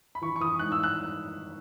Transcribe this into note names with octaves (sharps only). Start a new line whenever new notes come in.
B5
E3 C#6
C#6
E3 D#6
G#2 F#6
E6
F#6